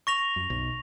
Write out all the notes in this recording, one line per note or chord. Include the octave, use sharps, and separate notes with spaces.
C#6 A#6 F7
F#2
B1